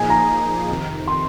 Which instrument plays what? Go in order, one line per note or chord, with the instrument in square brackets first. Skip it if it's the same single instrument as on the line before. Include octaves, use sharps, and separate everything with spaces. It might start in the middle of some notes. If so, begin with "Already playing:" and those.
Already playing: [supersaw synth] A#2 F3 A#3 D#4 G#4 [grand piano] G#5
[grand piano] A#5
[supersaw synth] F2 C3 D#3
[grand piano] C6